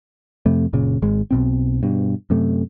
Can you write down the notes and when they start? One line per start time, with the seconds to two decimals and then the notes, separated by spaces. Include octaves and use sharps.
0.46 F2 C3 A3
0.73 F#1 A#2 C#3
1.02 G#1 G#3
1.31 B1 B2 C4
1.83 G2 B2
2.30 F#2 C3 A3